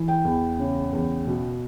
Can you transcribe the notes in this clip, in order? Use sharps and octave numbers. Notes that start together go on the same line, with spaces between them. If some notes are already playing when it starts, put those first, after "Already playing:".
Already playing: E3
G5
E2
C#3
E2
B2